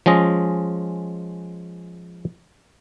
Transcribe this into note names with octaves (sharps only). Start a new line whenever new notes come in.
F3 G#3 C#4 D#5